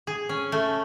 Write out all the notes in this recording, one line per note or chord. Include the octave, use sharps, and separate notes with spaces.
G#4
C#4
A3